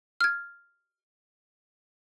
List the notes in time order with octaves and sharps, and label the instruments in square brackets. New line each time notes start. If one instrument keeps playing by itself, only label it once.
[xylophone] F6 G#6